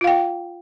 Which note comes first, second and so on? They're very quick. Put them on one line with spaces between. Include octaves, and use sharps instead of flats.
F4 F5 G5